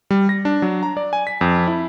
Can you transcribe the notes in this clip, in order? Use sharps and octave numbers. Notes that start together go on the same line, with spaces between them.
G3
A#6
D4
F#3
A#5
D5
G#5
B6
F2
E4